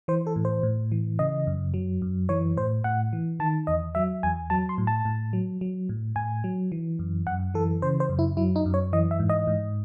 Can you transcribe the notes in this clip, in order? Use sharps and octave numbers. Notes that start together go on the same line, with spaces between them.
E3 C5
A4
A2
C5
A2
E3
C#3 D#5
F#2
F#3
F#2
E3 C#5
A2 C5
A2 F#5
E3
D#3 A5
E2 D#5
F#3 E5
E2 G#5
F#3 A5
C6
A2
A5
A2
F#3
F#3
A2
A2 G#5
F#3
E3
F#2
F#2 F#5
E3 A4
C#3 C5
C5
F#2
E4
F#3 E4
D#4
F#2
C#5
E3 D#5
E5
G#2
D#5
G#2